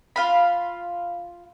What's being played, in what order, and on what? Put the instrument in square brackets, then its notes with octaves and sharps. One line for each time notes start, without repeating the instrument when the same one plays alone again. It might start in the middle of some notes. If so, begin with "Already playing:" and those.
[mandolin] F4 F5 B5